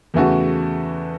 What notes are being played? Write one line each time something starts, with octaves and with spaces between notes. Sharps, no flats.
E2 C#3 E3 A3 F#4